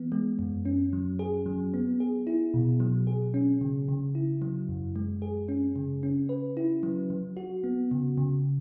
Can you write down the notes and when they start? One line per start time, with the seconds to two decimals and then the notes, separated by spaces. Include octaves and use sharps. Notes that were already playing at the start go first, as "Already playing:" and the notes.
Already playing: E3 B3
0.12 G#3
0.39 F#2
0.65 C#4
0.93 F#3
1.19 G#4
1.46 F#3
1.74 B3
2.00 G#4
2.27 E4
2.54 B2
2.80 F#3
3.07 G#4
3.34 C#4
3.61 C#3
3.89 C#3
4.15 E4
4.42 F#3
4.69 F#2
4.96 G#3
5.22 G#4
5.49 C#4
5.76 C#3
6.03 C#4
6.29 B4
6.57 E4
6.83 F#3
7.10 F#3
7.37 F#4
7.64 B3
7.91 C#3
8.18 C#3